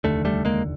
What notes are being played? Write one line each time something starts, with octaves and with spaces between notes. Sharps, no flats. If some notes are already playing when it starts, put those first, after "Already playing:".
F1 D#2 D3 A3
G3 A3
G#3 A#3